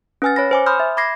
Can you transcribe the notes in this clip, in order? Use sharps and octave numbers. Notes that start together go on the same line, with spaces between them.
C#4 B4 G#5 F6 A6
C#5 B5 A#6
C5 G#5 D6
B5 C6 D#6 F6 G6
E5
B5 D6 G#6 A#6 C7